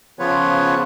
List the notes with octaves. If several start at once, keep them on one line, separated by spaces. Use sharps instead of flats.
C#3 F3 B3 F4 B4 C#5